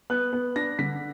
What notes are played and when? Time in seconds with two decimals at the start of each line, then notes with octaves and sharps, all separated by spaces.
0.10 B3 F#6
0.33 B3
0.56 D4 A#6
0.79 D3 B6